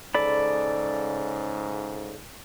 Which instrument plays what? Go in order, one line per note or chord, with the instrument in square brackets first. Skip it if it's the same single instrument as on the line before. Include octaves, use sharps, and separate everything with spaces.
[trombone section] G#2 C#3 [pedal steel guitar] A4 D5 B5